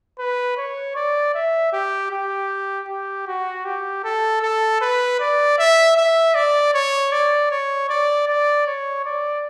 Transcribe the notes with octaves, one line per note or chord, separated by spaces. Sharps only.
B4
C#5
D5
E5
G4
G4
G4
F#4
G4
A4
A4
B4
D5
E5
E5
D5
C#5
D5
C#5
D5
D5
C#5
D5